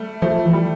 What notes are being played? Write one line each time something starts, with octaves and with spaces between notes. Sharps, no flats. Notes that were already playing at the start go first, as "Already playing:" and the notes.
Already playing: G3 A3
F3 A3
E3
G3